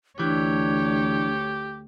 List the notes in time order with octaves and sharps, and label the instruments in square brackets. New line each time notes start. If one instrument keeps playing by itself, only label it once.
[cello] D2 C#5 [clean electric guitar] E3 [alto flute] D4 [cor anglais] G4